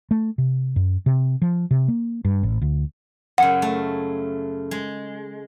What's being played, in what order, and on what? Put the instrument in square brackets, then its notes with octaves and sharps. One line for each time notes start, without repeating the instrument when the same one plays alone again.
[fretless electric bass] A3
C3
F#2
C3
F3
C3
A#3
G2
A1
D2
[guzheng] F#2 C#3 [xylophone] F#5
[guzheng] A3
G#3